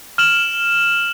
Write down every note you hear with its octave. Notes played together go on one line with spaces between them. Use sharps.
F6 E7 F#7